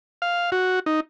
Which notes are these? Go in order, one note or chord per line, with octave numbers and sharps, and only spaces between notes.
F5
F#4
D#4